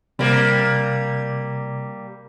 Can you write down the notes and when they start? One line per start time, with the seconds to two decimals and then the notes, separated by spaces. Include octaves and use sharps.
0.19 C3 G3 A#3